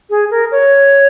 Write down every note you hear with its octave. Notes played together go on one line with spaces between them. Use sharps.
G#4
A#4
C#5